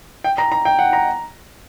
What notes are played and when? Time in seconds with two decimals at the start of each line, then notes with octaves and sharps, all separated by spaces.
0.24 G5
0.38 A#5
0.52 A#5
0.65 G5
0.79 F#5
0.93 A#5